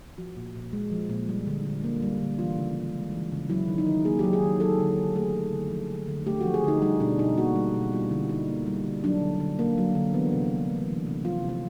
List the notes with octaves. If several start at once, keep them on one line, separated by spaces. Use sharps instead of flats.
F3 F#4
A#2
A#2
G#3
F3
A#2
G3
D3
D3
A#3
G3
D3
E3 F4
C#3
C#3
G#3
E3
C#3
F#3 E4
D#3
D#4
D#3
A#3 G#4
F#3 G4
G#4
D#3
F#3 A4
D3
D3
A3 G#4
F#3
D3
F3
D3
D3
A3 G4
F3 F#4
G#4
D3 D#4
G3 D#4
B2 D4
B2 D#4
A#3 F#4
G3
B2
G3 F4
D3 E4
D3 D#4
A#3
G3
D3
F#3 D4
D3
D3
A#3
F#3
D3
E3 B3
C3
C3
A3
E3
C3
F3 F4
E4
C3
F4